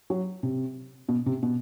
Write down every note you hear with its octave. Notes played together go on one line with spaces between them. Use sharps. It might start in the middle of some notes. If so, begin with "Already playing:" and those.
F#3
C3
B2
C3
B2